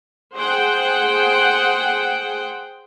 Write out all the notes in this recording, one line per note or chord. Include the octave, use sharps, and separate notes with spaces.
G#4 C5 F#5 G5